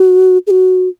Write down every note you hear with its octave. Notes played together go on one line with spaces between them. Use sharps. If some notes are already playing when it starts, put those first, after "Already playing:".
Already playing: F#4
G#4
F#4